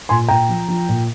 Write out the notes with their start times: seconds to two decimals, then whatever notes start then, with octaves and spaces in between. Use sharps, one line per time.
0.09 A#2 G#5 C6
0.28 A#2 G5 A#5
0.49 F3
0.68 F3
0.88 A#2